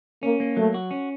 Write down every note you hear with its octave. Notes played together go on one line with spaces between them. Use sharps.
A#3 C#4
A#3
F#3 A3
F#4
C#4